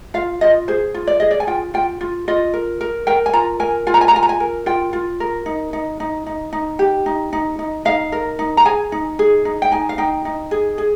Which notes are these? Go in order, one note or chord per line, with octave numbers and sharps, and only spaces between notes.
F4 F5
F4 D#5
G#4 C5
F4
D5
G#4 D#5
D5
G#5
F4 G5
F4 G5
F4
F4 D#5
A#4
A#4
A#4 G5
G#5
F4 A#5
A#4 G#5
F4 G#5
A#5
G#5
A#5
F4 G#5
A#5
G#5
A#4
F4 G5
F4
A#4
D#4
D#4
D#4
D#4
D#4
G4
D#4
D#4
D#4
D#4 F5
A#4
D#4
A#5
G#4 G#5
D#4
G#4
D#4
G5
D#4 G#5
F5
D#4 G5
D#4
G#4
G#4